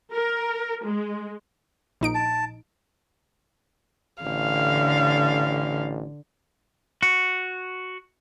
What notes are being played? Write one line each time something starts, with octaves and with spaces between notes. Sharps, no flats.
A#4
G#3
A#1 D#4 D7
A5
A1 D3 F5
F#4